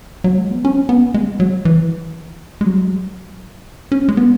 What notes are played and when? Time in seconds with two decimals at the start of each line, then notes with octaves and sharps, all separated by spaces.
0.24 F#3
0.38 G#3
0.51 B3
0.65 C#4
0.89 B3
1.14 G#3
1.40 F#3
1.65 E3
2.61 G#3
2.66 F#3
3.92 C#4
4.09 G#3
4.17 B3